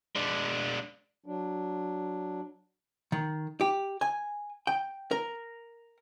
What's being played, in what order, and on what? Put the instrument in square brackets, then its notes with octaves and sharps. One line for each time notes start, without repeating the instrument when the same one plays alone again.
[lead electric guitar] G#3 D4
[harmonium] F#3 D4
[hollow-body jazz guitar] D#3
G4
G#5
G5
A#4